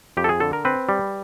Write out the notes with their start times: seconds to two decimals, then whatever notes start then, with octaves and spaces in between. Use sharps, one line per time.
0.17 F2 G4
0.24 A4
0.29 G#4
0.40 D3 A4
0.53 A#4
0.65 C4 B4
0.89 G3